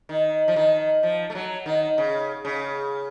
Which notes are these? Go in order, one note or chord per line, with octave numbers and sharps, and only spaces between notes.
D#3
F3
D#3
F3
A3
F#3
D#3
C#3
C#3